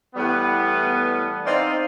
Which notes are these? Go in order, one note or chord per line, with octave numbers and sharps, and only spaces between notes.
A2 E3 G3 B3
C4 D#4 D5 D#5 F5